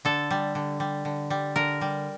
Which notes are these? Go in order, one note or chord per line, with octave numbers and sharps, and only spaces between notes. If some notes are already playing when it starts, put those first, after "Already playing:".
D3 A4
G3
D3
G3
D3
G3
D3 A#4
G3